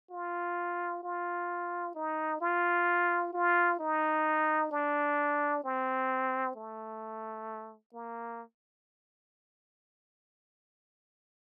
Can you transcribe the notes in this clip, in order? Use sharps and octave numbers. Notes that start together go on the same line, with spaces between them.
F4
F4
D#4
F4
F4
D#4
D4
C4
A3
A#3